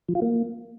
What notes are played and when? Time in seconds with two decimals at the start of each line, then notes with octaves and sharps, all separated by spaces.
0.09 F3
0.15 F4
0.22 A#3